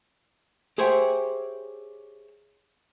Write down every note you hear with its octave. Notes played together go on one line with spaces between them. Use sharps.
G4 G#4 C5 C#5 E5 G5